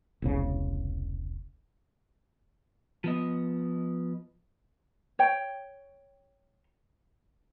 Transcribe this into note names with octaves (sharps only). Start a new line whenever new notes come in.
E1 C2 C#3
F3 B3 D#5
C#5 G5